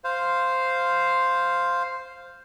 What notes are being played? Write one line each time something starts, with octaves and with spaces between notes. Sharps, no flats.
C5 F5